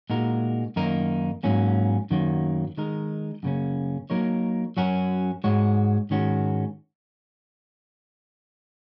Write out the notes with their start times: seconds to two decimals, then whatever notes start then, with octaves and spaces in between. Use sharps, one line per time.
0.10 A#2 G#3 D#4 F#4 A#4
0.76 F#2 D#3 A#3 D#4 A#4
1.43 G#2 F#3 A#3 C#4
2.11 F#2 D#3 F#3 A#3
2.77 D#3 G#3 D#4 A#4
3.43 F#2 C#3 A#3 C#4
4.10 F#3 A#3 D#4 A#4 C#5
4.77 F#2 F#3 C#4 F#4 A#4
5.44 G#2 G#3 F#4 C#5
6.10 G#2 D#3 G#3 C#4 F#4